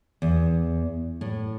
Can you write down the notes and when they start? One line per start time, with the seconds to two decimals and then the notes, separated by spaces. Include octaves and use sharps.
0.22 E2
1.21 A2